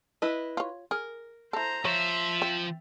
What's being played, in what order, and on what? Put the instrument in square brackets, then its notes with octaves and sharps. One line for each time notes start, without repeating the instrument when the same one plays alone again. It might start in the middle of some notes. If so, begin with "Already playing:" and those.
[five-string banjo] E4 B4 D#5
[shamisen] F4 C#5
[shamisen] G#4 [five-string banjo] A#4
[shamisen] E4 A4 [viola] C5 A#5
[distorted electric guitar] F3 C5 [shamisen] C#5 [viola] E5
[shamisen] C4